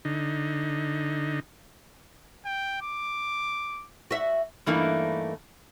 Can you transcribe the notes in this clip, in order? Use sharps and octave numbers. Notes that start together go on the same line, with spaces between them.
D3 D#4
G5
D6
F#4 E5
G2 E3 A3 A#3 D#4